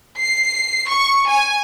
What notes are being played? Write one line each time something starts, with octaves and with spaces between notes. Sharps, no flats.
C7
C#6
G#5